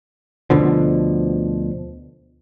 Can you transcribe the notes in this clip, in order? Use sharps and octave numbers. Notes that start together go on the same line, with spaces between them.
D2 B2 D3 F3